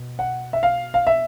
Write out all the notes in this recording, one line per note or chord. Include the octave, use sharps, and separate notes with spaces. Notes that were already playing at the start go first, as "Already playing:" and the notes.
Already playing: B2
F#5
E5
F5
F5
E5